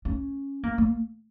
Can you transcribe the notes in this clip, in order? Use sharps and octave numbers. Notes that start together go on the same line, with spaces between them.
C#4
A#3
A#3